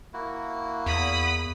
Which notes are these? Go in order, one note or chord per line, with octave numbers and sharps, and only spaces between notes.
A#3 E4 F#4
E2 B5 D#6